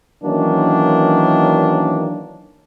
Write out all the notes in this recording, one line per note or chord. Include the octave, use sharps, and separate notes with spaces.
D#3 E3 F#3 A#3 C#4 D4